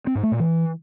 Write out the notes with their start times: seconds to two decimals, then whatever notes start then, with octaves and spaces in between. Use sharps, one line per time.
0.07 C4
0.15 G#2
0.23 A3
0.32 A#2
0.40 E3